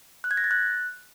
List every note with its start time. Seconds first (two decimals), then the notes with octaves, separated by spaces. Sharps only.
0.24 F#6
0.31 G#6
0.37 A#6
0.44 A6
0.51 F#6